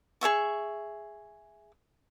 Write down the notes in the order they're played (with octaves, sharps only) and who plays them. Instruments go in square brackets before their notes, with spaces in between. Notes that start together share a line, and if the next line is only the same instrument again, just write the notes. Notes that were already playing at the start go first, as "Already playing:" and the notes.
[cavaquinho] G#4 C#5 E5 C#6